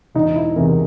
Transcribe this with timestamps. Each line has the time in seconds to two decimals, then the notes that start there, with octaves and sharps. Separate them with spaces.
0.15 E1 D#4
0.36 E4
0.56 E2 C3 E3 A#4